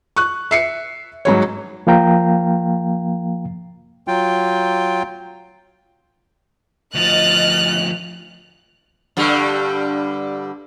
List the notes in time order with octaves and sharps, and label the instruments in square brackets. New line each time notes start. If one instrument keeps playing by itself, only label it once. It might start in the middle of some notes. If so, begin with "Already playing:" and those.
[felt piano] C#6 F#6
E5 C7 C#7
G#2 F#3 C#5
[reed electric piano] F3 A#3 F5 G5 A#5
[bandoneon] F#3 F4 G5
[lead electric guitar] D2 F3 [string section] D#5 F6 A6 [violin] F#6 [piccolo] F7
[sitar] G2 D3 G3